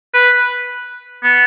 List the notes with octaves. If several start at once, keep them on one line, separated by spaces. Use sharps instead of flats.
B4
B3